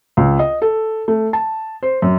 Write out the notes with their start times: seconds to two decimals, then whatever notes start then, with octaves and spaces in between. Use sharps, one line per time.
0.17 C#2
0.39 D#5
0.62 A4
1.08 A3
1.33 A5
1.83 C5
2.02 F#2